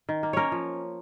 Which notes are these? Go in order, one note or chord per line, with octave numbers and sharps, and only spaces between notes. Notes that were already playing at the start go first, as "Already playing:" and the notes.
D#3
A#3
A#3 C#4 A#4 C#5
F3